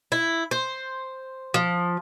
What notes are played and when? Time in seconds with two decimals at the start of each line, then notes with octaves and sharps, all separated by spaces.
0.12 E4
0.51 C5
1.54 F3